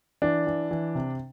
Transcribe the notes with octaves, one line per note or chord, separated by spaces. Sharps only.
E3 D4
E3
E3
C3